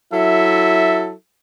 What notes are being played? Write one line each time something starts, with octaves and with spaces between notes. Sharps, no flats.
F#3 E4 A4 E5